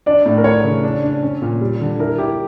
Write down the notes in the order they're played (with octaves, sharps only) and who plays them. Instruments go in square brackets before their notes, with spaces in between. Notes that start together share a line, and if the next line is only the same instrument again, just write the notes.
[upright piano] D4 [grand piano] D5
[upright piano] A2
[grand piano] A#4
[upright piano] D4 [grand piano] C#5
[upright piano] C#3
D4
D4
C#4
A#2
G3
D3
[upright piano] E4 [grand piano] A#4
[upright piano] E4 [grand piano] G4